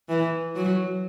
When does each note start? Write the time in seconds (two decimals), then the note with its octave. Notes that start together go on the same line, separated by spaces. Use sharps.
0.09 E3
0.56 F#3